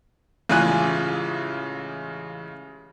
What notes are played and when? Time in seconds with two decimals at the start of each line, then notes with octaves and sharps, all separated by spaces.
0.49 A1 C#3 G#3 F4 G#5 F#6